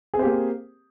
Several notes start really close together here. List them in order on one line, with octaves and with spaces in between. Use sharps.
G#4 C4 C5 G4 A#3